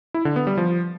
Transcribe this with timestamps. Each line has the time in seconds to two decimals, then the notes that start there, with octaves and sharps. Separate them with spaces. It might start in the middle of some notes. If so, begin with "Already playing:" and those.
0.14 E4
0.25 D3
0.36 B3
0.47 G3
0.58 F3